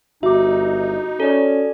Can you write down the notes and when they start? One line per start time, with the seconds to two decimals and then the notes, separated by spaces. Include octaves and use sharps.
0.23 G1 D#4 F#4 E5 D6
1.20 C#4 A4 D5